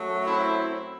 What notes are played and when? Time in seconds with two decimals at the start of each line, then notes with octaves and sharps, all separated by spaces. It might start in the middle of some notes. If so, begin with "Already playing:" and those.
Already playing: F#2 F#3 A3
0.26 C4 E4